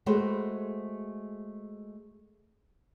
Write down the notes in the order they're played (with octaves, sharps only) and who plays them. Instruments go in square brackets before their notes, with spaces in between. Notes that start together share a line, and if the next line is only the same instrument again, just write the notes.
[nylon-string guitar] G#3 A3 F#4 B4 C5